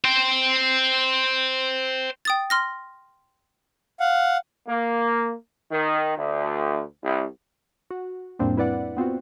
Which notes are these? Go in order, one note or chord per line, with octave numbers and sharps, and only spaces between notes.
C5 G5
G5 D#6 A6
C6 F6 A#6
F5 F#5
A#3
D#3
D2
C2
F#4
F2 A2 G3 A#3 C4 D4
E4 B4 D5 F#5
B3 C4 F4 F#4